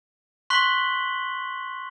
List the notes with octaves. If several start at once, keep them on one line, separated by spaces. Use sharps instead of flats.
C6 C#6 F#6 B6 F#7 G7